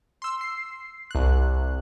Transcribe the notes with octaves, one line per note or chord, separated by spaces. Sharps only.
C6 E6
C7
C2 F#6